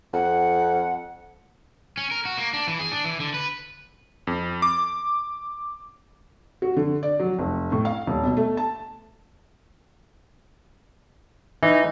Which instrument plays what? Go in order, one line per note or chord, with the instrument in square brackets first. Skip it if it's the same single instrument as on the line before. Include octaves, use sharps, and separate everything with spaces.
[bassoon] F2 [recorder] F#5
[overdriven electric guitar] C#4
A#4
F#4
A#3
D4
E3
G#4
D4
E3
D3
B4
[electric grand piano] F2
D6
[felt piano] F#4
D3
D5
F#3
F1
A2
F5
D#1
B2
A3
A5
[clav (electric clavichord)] E3 [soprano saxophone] D#4